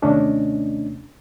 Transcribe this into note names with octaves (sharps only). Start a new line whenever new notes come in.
D#2 C3 A3 C#4 D4 D#5